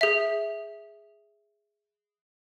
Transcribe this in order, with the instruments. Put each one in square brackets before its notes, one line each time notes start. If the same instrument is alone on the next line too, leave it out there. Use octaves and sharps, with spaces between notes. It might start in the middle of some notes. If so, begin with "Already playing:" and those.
[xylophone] G#4 E5